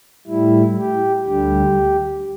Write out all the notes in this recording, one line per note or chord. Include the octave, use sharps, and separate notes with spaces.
A2 G3 E4
G4
D2 D3 G3 G4